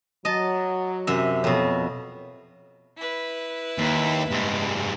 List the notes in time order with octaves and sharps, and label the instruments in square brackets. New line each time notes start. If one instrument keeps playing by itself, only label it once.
[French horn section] F#3 [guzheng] D#5 A5
[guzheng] F#2 C3 E5
[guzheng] F2 B2 [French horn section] C#5
[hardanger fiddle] E4 B4
[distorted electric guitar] D#2
G2 G#3